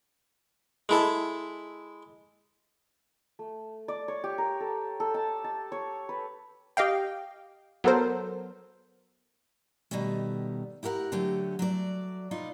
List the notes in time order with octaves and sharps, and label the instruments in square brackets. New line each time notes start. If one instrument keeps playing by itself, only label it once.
[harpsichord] G#3 E4 A4
[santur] A3
D5
C#5
G4
A#4
A4
A4
A5
A5
C#5
B4
[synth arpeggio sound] G4 D#5 F5 G5
F#3 B3 A4 A#4 C5
[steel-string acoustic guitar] B2 D#3 G3 A3
E4 G4 A#4 F5 F#5
D3 F#3 A3 G4
F#3 A3 D5
B2 D#4 F4 D5